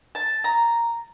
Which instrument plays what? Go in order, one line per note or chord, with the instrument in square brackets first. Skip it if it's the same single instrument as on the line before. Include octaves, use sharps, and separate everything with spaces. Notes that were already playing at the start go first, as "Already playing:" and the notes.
[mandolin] A5
A#5